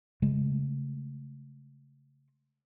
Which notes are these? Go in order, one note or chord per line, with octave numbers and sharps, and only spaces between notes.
C#3 G#3 A3